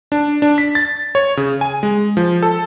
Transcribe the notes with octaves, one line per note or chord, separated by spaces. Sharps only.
D4
D4
B6
A6
C#5
C#3
G#5
G#3
F3
A4